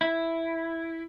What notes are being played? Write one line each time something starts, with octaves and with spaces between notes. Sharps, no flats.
E4